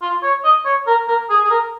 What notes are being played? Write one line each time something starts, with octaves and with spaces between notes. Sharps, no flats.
F4
C#5
D#5
C#5
A#4
A#4
G#4
G#4
A#4